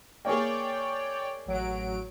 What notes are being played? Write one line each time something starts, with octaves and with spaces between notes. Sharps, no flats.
A#3 G#4 C#5 D5 G5
A1 F#3 D7